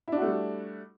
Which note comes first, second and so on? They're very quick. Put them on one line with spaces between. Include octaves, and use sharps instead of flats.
E4 D4 F#4 A3 G3